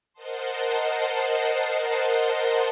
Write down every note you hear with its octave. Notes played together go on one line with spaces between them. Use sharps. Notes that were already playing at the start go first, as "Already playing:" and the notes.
A#4 C5 D#5 F#5 A5 C6